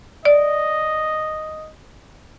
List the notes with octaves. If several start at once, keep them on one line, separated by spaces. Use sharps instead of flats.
D5 D#5